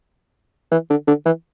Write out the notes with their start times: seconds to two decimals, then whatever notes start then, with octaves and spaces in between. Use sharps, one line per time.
0.72 E3
0.90 D3
1.07 D3
1.26 E3